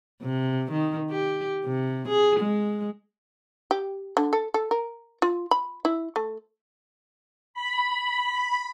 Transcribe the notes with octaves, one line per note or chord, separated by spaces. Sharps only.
C3
D#3
G4
C3
G#4
G#3
G4
D3
A4
A4
A#4
F4
B5
E4
A3
B5